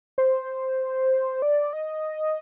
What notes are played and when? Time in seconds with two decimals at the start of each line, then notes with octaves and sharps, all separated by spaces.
0.18 C5
1.42 D5
1.73 D#5